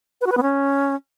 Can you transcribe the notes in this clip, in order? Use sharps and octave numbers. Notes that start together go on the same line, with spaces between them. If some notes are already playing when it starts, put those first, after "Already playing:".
B4
F#4
B4
B3
C#4